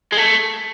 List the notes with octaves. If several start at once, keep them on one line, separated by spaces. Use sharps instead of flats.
G#3
A3